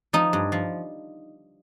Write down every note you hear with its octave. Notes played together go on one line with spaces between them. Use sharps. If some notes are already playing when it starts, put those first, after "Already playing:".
F3 D#4
G2
F3